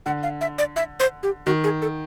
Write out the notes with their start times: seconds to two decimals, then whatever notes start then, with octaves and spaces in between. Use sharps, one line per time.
0.06 D3 F#5
0.23 F5
0.41 E5
0.58 D5
0.76 E5
1.00 C5
1.23 G4
1.46 D#3 F#4
1.64 G#4
1.82 A4